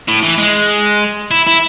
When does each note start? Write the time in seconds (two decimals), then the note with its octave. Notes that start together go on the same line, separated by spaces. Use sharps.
0.08 A2
0.23 E3
0.38 G#3
1.31 E4
1.47 E4